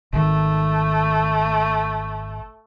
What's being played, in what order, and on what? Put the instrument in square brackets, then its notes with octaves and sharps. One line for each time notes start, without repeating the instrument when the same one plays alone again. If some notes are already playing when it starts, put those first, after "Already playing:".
[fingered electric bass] G#1 D#3 [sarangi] A3